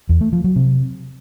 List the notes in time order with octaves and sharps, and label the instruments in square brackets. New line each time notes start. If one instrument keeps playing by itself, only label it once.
[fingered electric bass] E2
A3
F3
F#3
C3